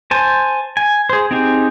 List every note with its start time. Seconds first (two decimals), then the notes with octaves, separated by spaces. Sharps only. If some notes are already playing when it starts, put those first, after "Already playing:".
0.11 C5 G#5 A5
0.77 G#5
1.09 G#4 C5
1.31 C4 D#4 G4 G#4